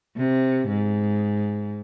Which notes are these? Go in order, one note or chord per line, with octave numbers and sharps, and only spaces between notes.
C3
G#2